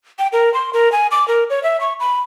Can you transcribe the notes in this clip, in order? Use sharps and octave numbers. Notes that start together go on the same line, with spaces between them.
G5
A#4
C6
A#4
G#5
D6
A#4
C#5
E5
C#6
B5